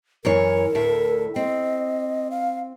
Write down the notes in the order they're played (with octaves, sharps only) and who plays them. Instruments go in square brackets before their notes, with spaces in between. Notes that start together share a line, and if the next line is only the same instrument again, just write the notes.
[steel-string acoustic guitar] F#2 E3 C#5 [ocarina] A#4
[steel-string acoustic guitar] D2 A2 E5
[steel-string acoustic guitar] C4 [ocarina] D#5
[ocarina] F5